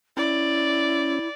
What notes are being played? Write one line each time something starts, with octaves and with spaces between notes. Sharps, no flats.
C#4 E4 D5